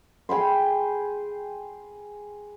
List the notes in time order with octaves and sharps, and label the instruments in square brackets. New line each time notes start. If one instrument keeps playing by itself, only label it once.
[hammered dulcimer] G#4 G5 B5 C6